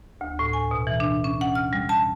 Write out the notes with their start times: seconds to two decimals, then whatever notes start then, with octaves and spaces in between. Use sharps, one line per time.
0.21 D2
0.39 A2
0.53 G#5
0.71 B2
0.87 E3
1.00 D4
1.24 C#4
1.41 F#5
1.55 F6
1.73 G3
1.89 A5